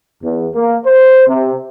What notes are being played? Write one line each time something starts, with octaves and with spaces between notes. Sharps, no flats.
E2
A#3
C5
C3